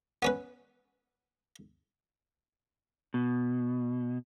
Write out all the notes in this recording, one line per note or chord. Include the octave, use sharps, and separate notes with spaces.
B3 C#4 B4
B2